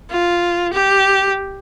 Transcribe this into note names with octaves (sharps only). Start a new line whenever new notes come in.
F4
G4